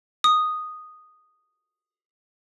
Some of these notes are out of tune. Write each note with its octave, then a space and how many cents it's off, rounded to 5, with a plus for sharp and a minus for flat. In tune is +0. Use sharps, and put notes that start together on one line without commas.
D#6 -5